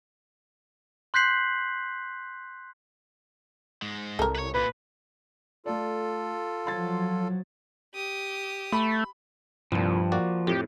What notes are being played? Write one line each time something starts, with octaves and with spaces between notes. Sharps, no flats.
C6 F#6 G6 B6 C7 F#7
G#2 G#3
C2 A4 A#4
B4 C#5
A#2 B4
A3 F4 A4 D5
F3 F#3 C6 G#6 A6
G4 D#6
A3 B5
C2 G2 A#2 F3
A#3 F#4 D5
F2 A2 G4